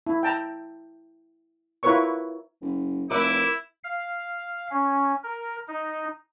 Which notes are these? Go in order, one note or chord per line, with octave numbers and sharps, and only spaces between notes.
E4
G5 A5 A#5
E4 F4 A#4 B4 C#5 C#6
F#1
F1 E4 A#4 B4 E5 D6
F5
C#4
A#4
D#4